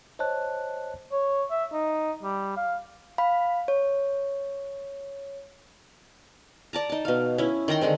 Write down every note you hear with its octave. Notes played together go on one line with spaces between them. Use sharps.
C5 C#5 D#5 A5 F#6
C#5
E5
D#4
G3
F5
F5 B5
C#5
D5 A5 A#5
D#4 A5
B2 F5
C#4 E4
D#3 G5 A#5 C6
D3 D#3 G#3 C4